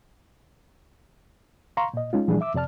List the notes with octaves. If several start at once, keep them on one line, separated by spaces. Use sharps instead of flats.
F5 A#5 C6 C#6
A#2 D#5
G#3 C#4 D#4 F4
A#2 E3 F3 G3 D4 G#4
E5 D6 E6
F2 C3 D5 A5 F6